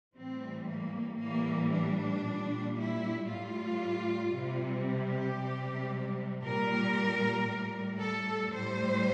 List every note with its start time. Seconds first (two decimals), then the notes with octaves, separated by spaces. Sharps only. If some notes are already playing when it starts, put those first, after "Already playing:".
0.15 A2 E3 G3 C4
0.68 A#3
1.20 A2 E3 G3 A#3
1.73 D4
2.24 A#2 G3
2.78 E4
3.29 A2 G3 F4
4.34 C3 G3
4.86 G4
5.38 C3 G3
6.43 A#2 G3 A#4
7.48 A2 G3
8.00 A4
8.52 A2 G3 C5